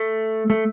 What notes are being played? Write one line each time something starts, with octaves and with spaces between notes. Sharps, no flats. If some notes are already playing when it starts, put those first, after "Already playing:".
Already playing: A3
A3